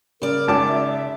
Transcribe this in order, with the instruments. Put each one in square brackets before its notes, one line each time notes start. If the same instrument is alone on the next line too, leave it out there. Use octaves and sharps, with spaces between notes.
[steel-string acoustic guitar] C#3 D5 [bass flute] A#4
[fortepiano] G#1 A5 D6
[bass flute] E5